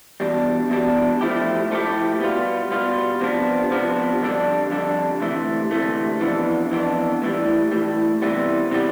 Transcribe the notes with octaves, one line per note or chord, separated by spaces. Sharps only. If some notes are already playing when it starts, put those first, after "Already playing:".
E2 B2 G3 D4
E2 B2 G3 D4
F3 A3 E4 G4
F3 A3 E4 G4
B2 G3 B3 F4
B2 G3 B3 F4
C3 F3 B3 D4
C3 F3 B3 D4
F2 D3 G3 D4
F2 D3 G3 D4
D2 C3 E3 A3
D2 C3 E3 A3
F2 E3 B3 D4
F2 E3 B3 D4
A2 E3 G3
A2 E3 G3
C3 E3 G3 B3
C3 E3 G3 B3